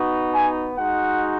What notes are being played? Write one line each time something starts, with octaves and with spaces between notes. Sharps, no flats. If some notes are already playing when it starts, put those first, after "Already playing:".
Already playing: B3 D#4 F#4
G#5
G#3 D#4 F#4 F#5